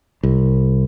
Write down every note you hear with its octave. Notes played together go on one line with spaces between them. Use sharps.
C2